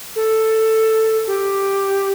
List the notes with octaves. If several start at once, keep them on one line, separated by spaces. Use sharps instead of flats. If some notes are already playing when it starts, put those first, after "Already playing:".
A4
G4